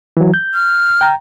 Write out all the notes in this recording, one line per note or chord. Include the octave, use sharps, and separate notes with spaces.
E3 F#3
G6
F6
G5 A#5